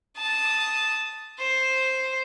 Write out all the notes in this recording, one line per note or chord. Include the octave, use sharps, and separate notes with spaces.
A5 D#6
C5